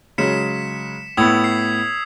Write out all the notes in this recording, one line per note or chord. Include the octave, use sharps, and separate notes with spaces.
C#3 F#3 G#3 B6 C#7 E7
A2 B3 D#6 E6 G#6
C7